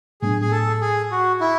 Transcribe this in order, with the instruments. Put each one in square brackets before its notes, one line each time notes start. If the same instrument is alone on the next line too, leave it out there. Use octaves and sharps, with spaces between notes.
[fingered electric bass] A2 F#3 B3 D4 [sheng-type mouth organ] G#4
[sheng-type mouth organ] G#4
A4
G#4
F#4
E4